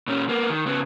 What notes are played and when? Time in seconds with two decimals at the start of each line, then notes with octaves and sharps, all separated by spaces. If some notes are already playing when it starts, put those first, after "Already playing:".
0.08 A#2 C#4
0.29 A#3 B3
0.50 D#3
0.66 C#3 B3